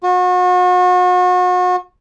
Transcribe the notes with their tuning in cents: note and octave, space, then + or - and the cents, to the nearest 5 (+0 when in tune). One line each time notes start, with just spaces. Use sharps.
F#4 -35